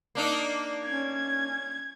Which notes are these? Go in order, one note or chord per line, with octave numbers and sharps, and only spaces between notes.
A#3 D4 D#4
C#4 G#6